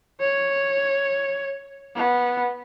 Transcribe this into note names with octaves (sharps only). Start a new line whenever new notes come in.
C#5
B3